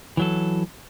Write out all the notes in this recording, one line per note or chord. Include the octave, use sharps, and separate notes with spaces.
E3 F#3 A4